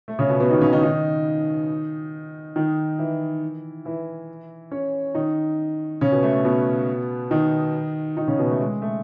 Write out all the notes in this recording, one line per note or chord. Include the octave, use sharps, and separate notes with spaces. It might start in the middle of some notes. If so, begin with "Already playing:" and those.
A3
C#3 C#4
B2 B3
B2 B3
D#3 D#4
C#3 C#4
D#3 D#4
D#3 D#4
D#3 D#4
E3 E4
E3 E4
C#4 C#5
D#3 D#4
C#3 C#4
B2 B3
A3
A3
B2 B3
D#3 D#4
D#3 D#4
C#3 C#4
B2 B3
A3
G#3
A3